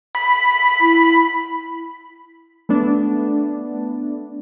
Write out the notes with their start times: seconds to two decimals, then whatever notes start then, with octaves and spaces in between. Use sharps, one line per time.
0.15 B5
0.81 E4
2.69 A3 B3 D4